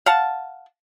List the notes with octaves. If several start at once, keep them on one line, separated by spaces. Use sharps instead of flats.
F5 F#5 A5